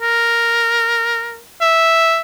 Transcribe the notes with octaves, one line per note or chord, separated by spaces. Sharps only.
A#4
E5